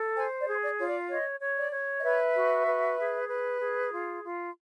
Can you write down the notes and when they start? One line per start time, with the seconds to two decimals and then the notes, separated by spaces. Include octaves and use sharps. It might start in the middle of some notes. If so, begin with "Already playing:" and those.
Already playing: A4
0.15 C5 G#5
0.39 D5
0.47 G#4
0.62 D5
0.78 F4 C#5
0.86 D5
1.10 C#5 D#5
1.41 C#5
1.57 D5
1.72 C#5
1.98 D#5
2.04 B4 E5
2.35 F#4
2.67 B4
2.98 G#4
3.29 B4
3.61 G#4
3.92 F4
4.23 F4